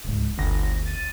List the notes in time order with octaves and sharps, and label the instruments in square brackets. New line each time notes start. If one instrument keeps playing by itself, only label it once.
[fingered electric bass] D1 C#2 G#2
[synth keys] G1 A#6 [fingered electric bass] D2
[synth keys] A6 D#7